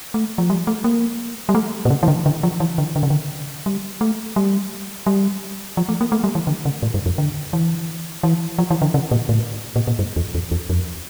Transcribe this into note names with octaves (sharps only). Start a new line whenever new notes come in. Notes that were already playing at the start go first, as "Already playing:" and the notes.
A3
F3
G3
A3
A#3
G3
A3
A#2
C#3
E3
D3
D3
F3
E3
D3
D3
C#3
D3
G3
A3
G3
G3
F3
A3
A#3
A3
G3
E3
D3
C#3
A2
G2
F2
D3
E3
E3
F3
E3
D3
C#3
A#2
A2
A#2
A#2
G2
E2
E2
E2
F2